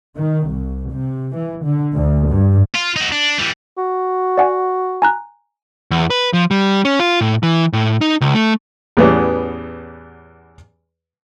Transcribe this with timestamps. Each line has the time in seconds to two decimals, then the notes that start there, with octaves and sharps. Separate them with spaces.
0.17 D#3
0.49 C2
0.92 C3
1.36 E3
1.64 D3
1.95 D2
2.30 G2
2.75 F4
2.96 D#4 F#4
3.12 D4
3.39 E3 G3
3.78 F#4
4.38 D5 F#5 G#5
5.02 G#5 A#5 F#6
5.91 E2
6.10 B4
6.33 F3
6.51 G3
6.85 C#4
7.00 F4
7.21 A2
7.43 E3
7.73 A2
8.01 D#4
8.21 C#2
8.35 A3
8.97 E2 A2 E3 G3 B3 C#4